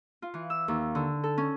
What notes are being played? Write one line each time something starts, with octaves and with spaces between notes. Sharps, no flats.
F4
E3
E6
D#2
D3
A4
C#4